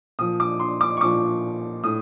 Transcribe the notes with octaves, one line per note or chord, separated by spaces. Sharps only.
A#2 F3 D#6
D6
C6
D6
C#6
A#2 F3 D6
A2 D#6